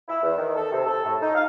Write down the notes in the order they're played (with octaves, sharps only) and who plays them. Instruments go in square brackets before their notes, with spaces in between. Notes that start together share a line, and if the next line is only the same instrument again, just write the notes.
[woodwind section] E4
E2
D#3
A4
C3
A4
A2
D#4
F5